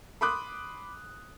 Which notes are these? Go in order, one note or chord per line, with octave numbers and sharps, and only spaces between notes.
B5 C6 D6 D#6 F#6